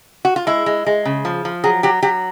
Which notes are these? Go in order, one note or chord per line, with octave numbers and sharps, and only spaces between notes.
F#4
F4
G#3 E4
G#3
G#3
C#3
F3
F3
F#3 G#4
F#3 G4
F#3 G4